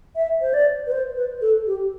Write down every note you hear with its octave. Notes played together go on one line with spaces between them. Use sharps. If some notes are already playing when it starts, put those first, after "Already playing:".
E5
C5
D5
B4
C5
B4
A4
G4